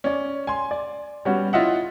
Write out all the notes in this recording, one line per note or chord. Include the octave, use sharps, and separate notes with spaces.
C#4 D5
G#5 C6
D5
G3 B3 C#4 F#4
E4 F4 D#5 E5 F#5